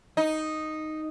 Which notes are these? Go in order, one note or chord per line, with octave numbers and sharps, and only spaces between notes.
D#4